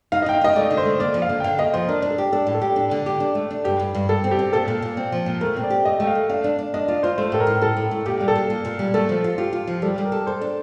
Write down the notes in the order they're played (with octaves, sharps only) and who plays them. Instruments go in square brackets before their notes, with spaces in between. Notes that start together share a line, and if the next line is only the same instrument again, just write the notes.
[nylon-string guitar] D#4 [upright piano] F5
[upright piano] D#5
[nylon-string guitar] D#4 [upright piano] G5
[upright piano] F5
[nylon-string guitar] D#4 [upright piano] D#5
[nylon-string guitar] A3 [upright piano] D5
[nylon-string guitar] D3
[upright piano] C5
[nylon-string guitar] A3
[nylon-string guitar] A#3 [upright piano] D5
[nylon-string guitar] F3
[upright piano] F5
[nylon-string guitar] D3
[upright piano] G5
[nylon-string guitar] D3 [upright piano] F5
[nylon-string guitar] A#3 [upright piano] D#5
[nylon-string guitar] F3 [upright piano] C5
[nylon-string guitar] D4 [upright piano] A#4
[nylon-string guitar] D4
[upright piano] A4
[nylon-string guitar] G4
[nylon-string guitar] D4 [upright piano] A4
[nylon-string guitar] A2
[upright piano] A4
[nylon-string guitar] G4
D4
D3
G4
D4
A3
D4
[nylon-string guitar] G2 [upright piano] G4
[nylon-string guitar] G2
G2
[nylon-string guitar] G2 [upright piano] A4
[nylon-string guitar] C4
[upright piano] G4
[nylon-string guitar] C4
[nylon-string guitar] A#2 [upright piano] A4
[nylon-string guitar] A#2
A#2
C4
F3
A#2
[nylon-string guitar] A3 [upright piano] A#4
[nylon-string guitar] C4
[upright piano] D5
[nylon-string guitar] G4
[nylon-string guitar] A3 [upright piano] D#5
[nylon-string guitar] A3 [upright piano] G5
[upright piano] F5
[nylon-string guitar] A3
[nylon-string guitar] D4 [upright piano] F5
[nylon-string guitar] D4
D4
[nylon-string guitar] D4 [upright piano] D#5
[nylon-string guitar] F4 [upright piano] D5
[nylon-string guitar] F4 [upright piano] C5
[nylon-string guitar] A3 [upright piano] C5
[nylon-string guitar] A2 [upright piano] A4
[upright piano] A#4
[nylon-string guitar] A2
[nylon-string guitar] A2 [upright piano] A4
[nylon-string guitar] A2
A3
[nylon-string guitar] A#2 [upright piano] G4
[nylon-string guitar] G3
[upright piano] A4
[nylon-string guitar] A#2
A#2
A#2
G3
[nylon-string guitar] A3 [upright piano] A4
[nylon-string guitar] F3
F4
[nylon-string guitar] F4 [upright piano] G4
[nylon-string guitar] F4
F3
[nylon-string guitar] G3 [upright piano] A4
[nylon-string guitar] G3
[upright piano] A#4
[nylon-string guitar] A4
[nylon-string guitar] A4 [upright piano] C5
[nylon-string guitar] D4